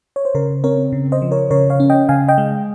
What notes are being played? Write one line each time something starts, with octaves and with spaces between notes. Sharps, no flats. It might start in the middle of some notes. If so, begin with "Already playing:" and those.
C#5
C5
C#3 A#4
C4 A#4 C#5
C#3
C5 D#5
F3
A#4 C#5
C#3 A#4 C#5
C#5 F5
C#4
D#5 G5
C#3 F5 G#5
D#5 G5
G#3